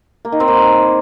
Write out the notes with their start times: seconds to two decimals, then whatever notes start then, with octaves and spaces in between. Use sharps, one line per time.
0.25 A#3
0.32 D#3
0.40 C4
0.48 A#3